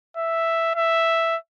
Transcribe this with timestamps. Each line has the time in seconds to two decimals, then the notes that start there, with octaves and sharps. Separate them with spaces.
0.17 E5
0.75 E5